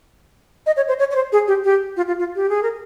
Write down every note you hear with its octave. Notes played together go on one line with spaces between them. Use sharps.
D#5
C#5
C5
C#5
C#5
C5
G#4
G4
G4
F4
F4
F4
G4
G#4
A#4